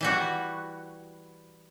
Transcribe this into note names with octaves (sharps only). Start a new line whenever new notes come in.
E3 G3 F#4